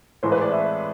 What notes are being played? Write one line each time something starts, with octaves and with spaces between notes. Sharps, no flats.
A2 E3 G#3 C5
B4
D5
E5